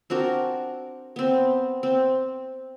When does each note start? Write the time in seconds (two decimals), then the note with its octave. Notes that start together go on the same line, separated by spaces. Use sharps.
0.10 C4 D4 F#4 A#4
1.16 B3 C4
1.83 C4